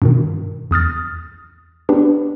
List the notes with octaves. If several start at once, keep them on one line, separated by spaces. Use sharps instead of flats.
G2 B2 D#3
E2 D#6 F6 A6
B3 C#4 D4 F#4 G4 B4